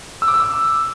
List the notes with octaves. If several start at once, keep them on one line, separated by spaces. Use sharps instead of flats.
E6
D6
E6
D6